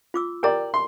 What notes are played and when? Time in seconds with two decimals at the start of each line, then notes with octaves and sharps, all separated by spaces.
0.14 F4 D6 E6
0.43 G4 A#4 D5 G5 A#5
0.74 C6